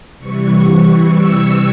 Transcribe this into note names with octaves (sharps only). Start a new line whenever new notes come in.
C3 E3 G3 C#6
E6